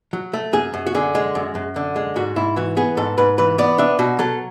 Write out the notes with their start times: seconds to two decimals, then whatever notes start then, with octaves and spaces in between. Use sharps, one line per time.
0.13 F#3
0.33 A3
0.53 F#2 G#4
0.74 F#2
0.86 F#4
0.95 D3 G#4
1.15 G#3
1.35 F#2
1.55 F#2
1.76 D3
1.96 G#3
2.16 G#2 F#4
2.36 G#2 E4
2.56 E3 F#4
2.77 B3 G#4
2.97 G#2 A4
3.18 G#2 B4
3.38 E3 B4
3.58 B3 D5
3.78 D4 E5
3.99 B2 F#4
4.19 F#3 A4